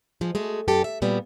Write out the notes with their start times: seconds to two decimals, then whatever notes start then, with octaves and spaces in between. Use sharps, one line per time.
0.21 F3 G#3
0.35 G#3 A3 F#4
0.68 F#2 G4 A4
0.84 E5
1.02 A#2 G3 B3 F#4